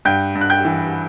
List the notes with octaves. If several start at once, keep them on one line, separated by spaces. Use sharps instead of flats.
G2 G5 G6
G2
F#6
G5 G6
E3